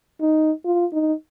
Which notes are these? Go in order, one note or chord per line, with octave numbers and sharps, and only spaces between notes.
D#4
F4
D#4